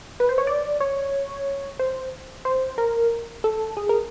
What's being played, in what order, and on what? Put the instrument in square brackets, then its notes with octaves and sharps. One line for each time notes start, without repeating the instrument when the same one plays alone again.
[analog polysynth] B4
C5
C#5
D5
C#5
C5
C5
A#4
A4
G#4
A#4